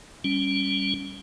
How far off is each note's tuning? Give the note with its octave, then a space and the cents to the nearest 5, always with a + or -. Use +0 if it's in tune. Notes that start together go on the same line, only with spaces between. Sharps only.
G3 +0 C#4 +0